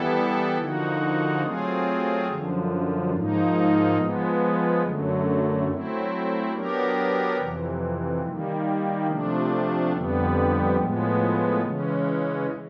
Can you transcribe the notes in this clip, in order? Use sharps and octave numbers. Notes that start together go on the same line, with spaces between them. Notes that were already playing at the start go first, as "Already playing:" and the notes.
Already playing: E3 G3 B3 E4 A4
D3 F3 A#3 D#4 F#4
F#3 A3 C4 F4 G#4
F#2 D3 F3
G#2 F3 A#3 D#4
F3 G#3 B3
F#2 D3 F#3 A3
F#3 A3 C4 E4
F#3 B3 D4 G4 A#4
F2 C3 E3
D#3 G3 A#3
C3 F3 A3 D4
F2 D3 G3 B3
A2 F3 G#3 B3
C#3 E3 G#3 C#4